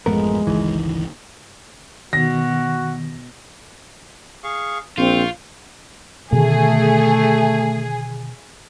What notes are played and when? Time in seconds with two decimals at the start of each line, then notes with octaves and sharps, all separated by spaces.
0.06 A1 F#2 F3 G#3 A3 B3 A#4
0.47 G1 C#2 D#3 E3
2.13 B2 D#3 F#4 A#6
4.44 G#4 F5 C#6
4.98 A#1 C4 F4 C5 C#6
6.32 B2 D3 D#3 A3 G#4